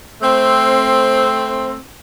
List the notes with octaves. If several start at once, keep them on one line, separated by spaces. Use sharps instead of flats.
A3 C4